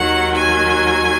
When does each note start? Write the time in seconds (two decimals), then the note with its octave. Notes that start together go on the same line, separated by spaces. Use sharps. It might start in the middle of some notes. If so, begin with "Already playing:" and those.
Already playing: D#2 D#3 F#3 F#5
0.34 G#5